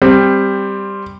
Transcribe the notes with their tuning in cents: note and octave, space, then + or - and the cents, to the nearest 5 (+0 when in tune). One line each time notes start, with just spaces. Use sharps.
G3 +10 C4 +0